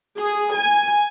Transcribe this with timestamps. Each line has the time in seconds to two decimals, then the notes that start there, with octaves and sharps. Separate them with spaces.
0.20 G#4
0.56 G#5